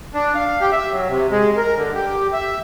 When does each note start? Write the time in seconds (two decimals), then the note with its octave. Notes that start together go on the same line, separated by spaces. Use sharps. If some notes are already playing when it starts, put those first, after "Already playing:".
0.14 D4
0.35 F5
0.61 G4
0.72 E5
0.91 F#3
1.08 C3
1.31 G#3
1.57 A#4
1.76 D3
1.95 G4
2.33 E5